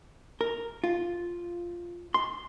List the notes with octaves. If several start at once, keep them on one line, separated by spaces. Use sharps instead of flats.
A#4
F4
C6